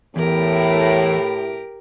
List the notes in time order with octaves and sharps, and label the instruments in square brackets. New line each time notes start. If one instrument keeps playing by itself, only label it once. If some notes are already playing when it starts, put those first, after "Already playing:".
[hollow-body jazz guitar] E2 [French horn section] A2 [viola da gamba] G4 A#4